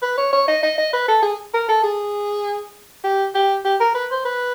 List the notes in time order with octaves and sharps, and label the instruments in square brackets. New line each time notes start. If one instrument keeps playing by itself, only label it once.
[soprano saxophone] B4
C#5
C#5
D#5
D#5
D#5
B4
A4
G#4
A#4
A4
G#4
G4
G4
G4
A#4
B4
C5
B4